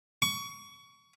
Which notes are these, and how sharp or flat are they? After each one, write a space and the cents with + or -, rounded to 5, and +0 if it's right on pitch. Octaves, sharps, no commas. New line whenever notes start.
C#6 +25